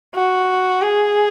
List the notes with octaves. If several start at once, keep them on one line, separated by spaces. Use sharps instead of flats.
F#4
G#4